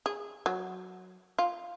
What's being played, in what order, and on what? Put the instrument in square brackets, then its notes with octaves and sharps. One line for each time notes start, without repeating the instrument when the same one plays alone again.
[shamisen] G#4
F#3
F4